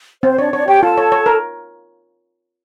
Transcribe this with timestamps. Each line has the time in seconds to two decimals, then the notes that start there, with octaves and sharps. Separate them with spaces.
0.23 C4 C5
0.38 D4 C#5 D5
0.53 D4 C#5 D5
0.67 G4 C#5 G5
0.83 F4 A4 A5
0.98 C#5
1.12 C#5
1.26 A#4